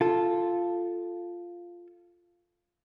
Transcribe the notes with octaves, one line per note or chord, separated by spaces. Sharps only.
F4 A4